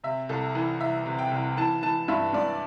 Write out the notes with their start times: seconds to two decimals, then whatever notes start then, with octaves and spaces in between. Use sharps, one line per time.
0.04 C3 E5
0.29 C2 A4
0.55 E3
0.80 C2 E5
1.06 C3
1.19 G5
1.31 C2
1.57 E3 A5
1.83 E3 A5
2.08 G2 E5
2.33 G2 D5